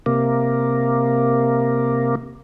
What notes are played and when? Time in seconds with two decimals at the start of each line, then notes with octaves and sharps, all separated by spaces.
0.06 C3 A#3